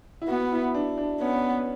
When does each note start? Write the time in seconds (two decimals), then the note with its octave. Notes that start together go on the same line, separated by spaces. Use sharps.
0.22 E4
0.28 B3 F#4
0.52 E4
0.74 D4
0.98 D4
1.21 B3 C#4